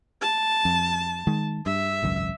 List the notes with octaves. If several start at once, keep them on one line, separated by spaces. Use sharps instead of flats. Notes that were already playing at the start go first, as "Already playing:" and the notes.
A5
F2
D#3 G#3
G2 E5
G#1 C#2 F#2